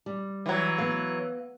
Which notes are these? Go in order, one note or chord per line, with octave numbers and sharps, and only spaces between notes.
G3
E3 F#3
B3 F5